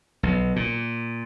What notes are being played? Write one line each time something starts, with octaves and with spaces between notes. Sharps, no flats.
B1
A#2